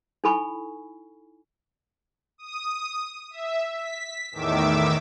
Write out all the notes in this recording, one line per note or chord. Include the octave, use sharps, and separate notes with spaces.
D#4 E4 A4 G#5 B5 C#6
D#6
E5
B6
E2 A2 D#3 E5 D6 E6